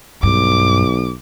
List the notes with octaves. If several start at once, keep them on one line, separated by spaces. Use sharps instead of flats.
B1 G2 D6